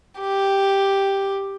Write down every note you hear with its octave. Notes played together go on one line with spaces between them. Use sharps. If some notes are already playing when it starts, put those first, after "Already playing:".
G4